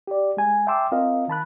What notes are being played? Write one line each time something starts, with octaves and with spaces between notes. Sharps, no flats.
G4 D5
G#3 G#5
E5 G5 A5 C6 D6 E6
C4 F4 A#4 D#5 F5
D#3 A5 B5 F#6